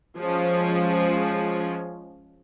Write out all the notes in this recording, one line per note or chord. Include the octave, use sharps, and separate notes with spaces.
F3 G#3 C#4